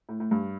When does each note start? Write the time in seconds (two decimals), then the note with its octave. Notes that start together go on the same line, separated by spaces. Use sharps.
0.09 A2
0.20 A2
0.31 G2